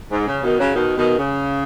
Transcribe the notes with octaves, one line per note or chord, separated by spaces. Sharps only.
G#2
C#3
B2 D#3
C#3 F#3
B2 D#3
B2 D#3
C#3